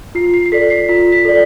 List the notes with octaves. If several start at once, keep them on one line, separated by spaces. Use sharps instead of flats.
F4 C7
C7
C7
A4 D5 B6
C7
F4 B6
B6
A4 D5